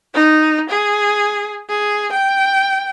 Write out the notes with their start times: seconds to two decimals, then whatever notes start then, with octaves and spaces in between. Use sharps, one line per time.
0.14 D#4
0.69 G#4
1.69 G#4
2.12 G5